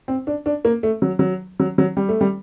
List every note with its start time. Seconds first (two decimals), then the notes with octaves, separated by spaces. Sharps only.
0.08 C4
0.27 D4
0.46 D4
0.65 A#3
0.83 A3
1.02 F#3
1.19 F#3
1.60 F#3
1.78 F#3
1.97 G3
2.09 A3
2.21 G3